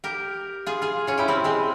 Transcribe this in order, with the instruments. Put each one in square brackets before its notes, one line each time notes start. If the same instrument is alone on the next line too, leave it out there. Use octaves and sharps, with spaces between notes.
[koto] G4 A#4
F4 G#4
F4 G#4
C#4 F4
E4 G4
C4 E4
G#3 C4